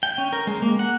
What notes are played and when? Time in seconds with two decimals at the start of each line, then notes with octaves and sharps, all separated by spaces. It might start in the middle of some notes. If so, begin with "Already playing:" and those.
0.03 G5
0.18 C#4
0.33 A#4
0.47 G#3
0.62 A#3
0.79 F#5